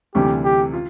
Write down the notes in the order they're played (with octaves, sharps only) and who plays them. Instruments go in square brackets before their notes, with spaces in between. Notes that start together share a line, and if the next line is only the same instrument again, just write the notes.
[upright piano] D2 C3 E3 G3 [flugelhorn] G4
[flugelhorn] G4
[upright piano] F4